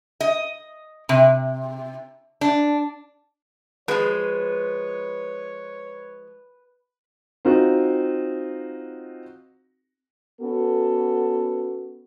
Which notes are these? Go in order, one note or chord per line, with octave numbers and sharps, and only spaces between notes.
D#5
C3
D4
F3 G#3 B4 C#5
C4 D#4 F4 F#4
B3 C#4 F#4 A4